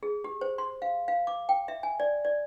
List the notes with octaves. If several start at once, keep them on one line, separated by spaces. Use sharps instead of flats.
G#4
G4
C5
C6
F5
F5
D6
G5
E5
G#5
D5
D5